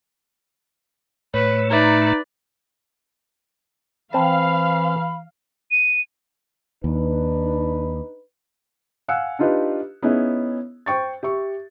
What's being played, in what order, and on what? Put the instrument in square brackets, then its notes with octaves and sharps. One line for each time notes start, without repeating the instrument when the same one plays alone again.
[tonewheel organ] A2 A3 [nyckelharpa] B4 [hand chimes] C#5
[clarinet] D#4 [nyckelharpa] B4 D5 [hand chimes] E5 A#5
[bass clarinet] E3 [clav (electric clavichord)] C4 A5 [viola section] F5 [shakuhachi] B5
[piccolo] D#7
[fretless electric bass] D#2 [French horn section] D4 D#4 B4
[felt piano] F5 F#5 G#5 E6 F#6 C#7
D4 D#4 F4 G4 B4 D#5
B3 C#4 D#4 E4 G#4
C5 G5 C#6 A6
G4 E5 C#6